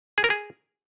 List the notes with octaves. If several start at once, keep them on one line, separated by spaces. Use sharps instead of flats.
G#4
A#4
G#4